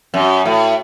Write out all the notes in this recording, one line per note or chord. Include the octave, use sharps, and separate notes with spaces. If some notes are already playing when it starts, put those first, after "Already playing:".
F#2
A2